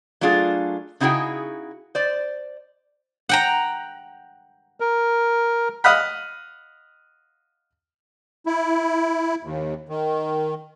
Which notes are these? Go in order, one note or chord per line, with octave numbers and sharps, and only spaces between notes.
F#3 A3 D4 F4 G#4
C#3 D#4 E4 F#4 G#4 G5
C5 D5
F#5 G5 A#5
A#4
D#5 F5 F#5 B5
E4
D#2
D#3